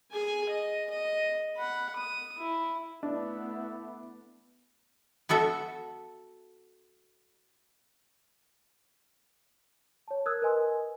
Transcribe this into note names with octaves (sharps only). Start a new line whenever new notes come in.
G#4 G#5
D#5
D#5
F#5 B5
D#6
E4
A3 B3 D4 E4
B3 F#4 A4 E5
C#5 A5
A#4 D#6 E6 F#6 G#6
A#4 B4 D#5 G#5 C6